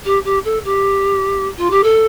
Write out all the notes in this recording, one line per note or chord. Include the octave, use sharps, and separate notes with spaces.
G4
G4
A4
G4
F4
G4
A4